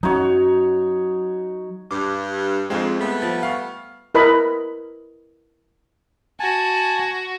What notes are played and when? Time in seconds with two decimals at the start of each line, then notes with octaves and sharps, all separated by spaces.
0.03 F#3 C#4 D#4 F#4 C#5
1.91 G2 D6
2.70 F2 G#3 C4 F4
3.00 G3 A3 B3
3.22 F3
3.43 F5 C#6
4.15 E4 A#4 B4 D#5 B5
6.40 F#4 G#5 A5